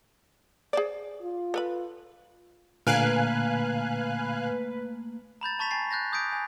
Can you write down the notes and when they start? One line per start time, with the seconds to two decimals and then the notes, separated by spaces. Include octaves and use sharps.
0.73 G#4 C5 D5
1.22 F4
1.54 A4 B4 B5
2.87 A#2 D3 A3 A#3 B4 F5 G#5 F#6
5.41 A#5 B5 G6 A6
5.59 A5 C#6 A6 B6 F7
5.71 G#5 A6 C7
5.91 F#6 G6 A6 A#6
6.12 D6 D#6 G6 G#6 B6 D7
6.33 G#5